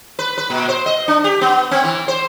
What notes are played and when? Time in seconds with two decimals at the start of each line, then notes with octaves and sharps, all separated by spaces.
0.19 B4
0.38 B4
0.50 A#2
0.68 C5
0.86 D#5
1.08 D4
1.24 G4
1.41 B3
1.71 C4
1.84 E3
2.08 C5